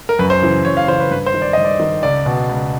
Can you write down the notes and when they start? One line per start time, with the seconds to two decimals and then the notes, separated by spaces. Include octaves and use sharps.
0.09 A#4
0.19 F#2 B4
0.30 C5
0.42 C#3 E3
0.65 F#2 C#5
0.77 F5
0.88 C#3 E3 C5
1.00 B4
1.11 G2 B4
1.26 C5
1.34 D#3
1.42 D5
1.53 G2 D#5
1.65 D5
1.80 D#3
2.03 C#2 D5
2.26 B2
2.49 C#2